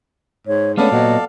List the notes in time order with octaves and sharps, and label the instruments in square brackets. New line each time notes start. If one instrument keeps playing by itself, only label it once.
[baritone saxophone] G#2 [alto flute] C#5
[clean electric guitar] G#3 C#4 D4 [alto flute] A3 [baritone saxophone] B3 [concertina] A4 D5 F5
[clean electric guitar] A#2 B3 [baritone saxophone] F#3 [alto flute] D#5